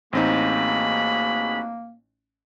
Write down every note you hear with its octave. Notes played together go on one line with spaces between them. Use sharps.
A1 A#3 C4 D#4 F#4 G#4 B5